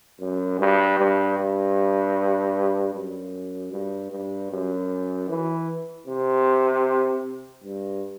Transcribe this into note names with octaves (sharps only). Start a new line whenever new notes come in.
F#2
G2
G2
G2
F#2
G2
G2
F#2
E3
C3
G2